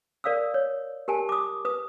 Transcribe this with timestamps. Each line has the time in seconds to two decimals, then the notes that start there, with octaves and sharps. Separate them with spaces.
0.24 A#4 D5 F5 D#6 E6
0.54 C#5
1.08 G4 A#4 G#5 A5
1.29 D6 D#6
1.65 B4 D#6